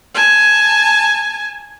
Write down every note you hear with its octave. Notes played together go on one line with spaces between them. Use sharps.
G#5 A5